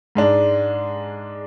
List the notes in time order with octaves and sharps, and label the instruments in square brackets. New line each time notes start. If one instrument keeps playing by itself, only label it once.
[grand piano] G#2 G#3 D4